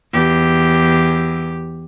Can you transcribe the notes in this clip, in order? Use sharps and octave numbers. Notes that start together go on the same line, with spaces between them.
E2 G4